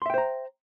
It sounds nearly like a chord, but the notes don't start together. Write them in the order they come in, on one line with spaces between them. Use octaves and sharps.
C6 E5 G5 C5 A#5